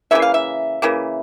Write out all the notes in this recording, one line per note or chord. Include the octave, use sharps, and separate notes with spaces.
C#3 E3 A#3 E5
F5
E5
C#3 E3 A#3